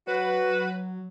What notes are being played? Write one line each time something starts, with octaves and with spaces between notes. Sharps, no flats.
F#3 F#4 B4